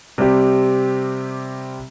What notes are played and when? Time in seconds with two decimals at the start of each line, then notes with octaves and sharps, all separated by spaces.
0.18 C3 G3 C4 G4